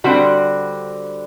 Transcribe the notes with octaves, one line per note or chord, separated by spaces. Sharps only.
D3 G3 C4 F#4